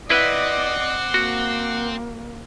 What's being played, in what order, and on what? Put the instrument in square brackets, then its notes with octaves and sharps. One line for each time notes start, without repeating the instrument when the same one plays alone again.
[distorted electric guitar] C4 [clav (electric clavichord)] E4 B4 [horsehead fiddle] D5 D#5 [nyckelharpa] F#5 D6
[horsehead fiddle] A#3 [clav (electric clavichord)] F#4